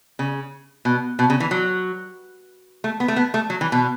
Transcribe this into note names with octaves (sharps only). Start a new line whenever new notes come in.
C#3
B2
B2
C#3
E3
F#3
A3
B3
A3
B3
A3
F#3
E3
B2